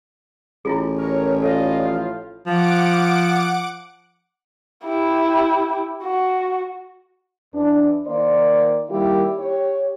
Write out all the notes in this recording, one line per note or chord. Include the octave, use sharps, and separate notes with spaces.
A1 E4 F4 G#4
A#4 C#5
F4 A4 D5 D#5
A2 F3
F3 F#5 D6 D7
E4 G4
F#4
E2 D4
D#3 A#3 C5 D5
D#3 G3 A#3 E4 G4
G4 C#5